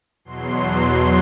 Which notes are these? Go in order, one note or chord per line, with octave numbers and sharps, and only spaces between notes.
E2 B2 F#3 C6
C6